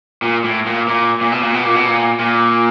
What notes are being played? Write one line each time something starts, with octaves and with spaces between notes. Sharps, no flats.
A#2
A2
A#2
A#2
A#2
B2
A#2
B2
A#2
B2
A#2
A#2